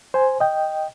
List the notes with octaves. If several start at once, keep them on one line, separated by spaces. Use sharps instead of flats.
C5 G#5
D#5 G5